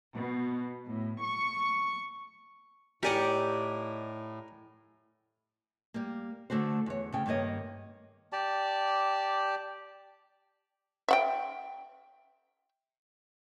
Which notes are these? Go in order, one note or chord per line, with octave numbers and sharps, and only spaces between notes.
B2
A2
C#6
A2 D#4 G4 A#4 D5 F#5 G#5
G3 A#3
D3 A3 F#4 C5
E2 C#5
D2 C#3 G5
G2 D#3 A#3 C#5 D#5
G4 D5 A5
E5 F#5 G5